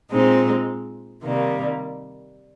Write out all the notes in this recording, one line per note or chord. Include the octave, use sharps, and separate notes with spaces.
A#2 G#3 C4 D#4
C3 D#3 G3 A#3